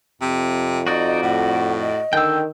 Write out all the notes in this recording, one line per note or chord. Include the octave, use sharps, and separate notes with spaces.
F2 C3
D#4 F#4 D5 D#5
A2 F#5
D#5
D3 D#3 G5 E6